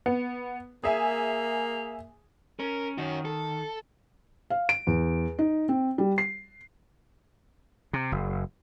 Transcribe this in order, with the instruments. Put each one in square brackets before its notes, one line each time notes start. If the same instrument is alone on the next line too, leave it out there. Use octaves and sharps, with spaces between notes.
[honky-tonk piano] B3
[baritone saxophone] A#3 [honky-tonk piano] G#4 E5 G#5
[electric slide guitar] C#4 [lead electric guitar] A#4
[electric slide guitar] D#3 [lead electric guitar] C#4 F#4
[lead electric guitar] A4
[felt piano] F5
D7
E2
D#4
C4
G3
C7
[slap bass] C3
F#1